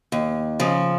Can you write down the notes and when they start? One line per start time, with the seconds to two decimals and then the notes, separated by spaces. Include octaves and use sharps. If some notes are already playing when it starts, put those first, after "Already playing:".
0.12 D#2
0.60 C#3 F3